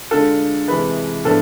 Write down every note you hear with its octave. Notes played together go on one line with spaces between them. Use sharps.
D3 G#3 D4 F4 A4
C3 E3 G#3 B4
A2 F3 B3 D4 A4